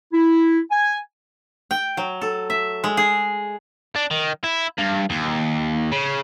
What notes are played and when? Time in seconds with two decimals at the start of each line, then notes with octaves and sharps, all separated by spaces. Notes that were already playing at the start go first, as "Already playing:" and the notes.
0.13 E4
0.71 G#5
1.71 G5
1.97 F#3
2.22 A4
2.50 E5
2.84 G#3
2.97 G#4
3.96 D4
4.11 D#3
4.44 E4
4.78 G2
5.10 D#2
5.92 C#3